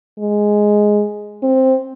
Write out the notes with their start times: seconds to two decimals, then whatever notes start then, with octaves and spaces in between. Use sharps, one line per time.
0.19 G#3
1.43 C4